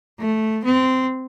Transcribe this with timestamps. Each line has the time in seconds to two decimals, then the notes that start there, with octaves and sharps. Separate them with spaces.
0.20 A3
0.65 C4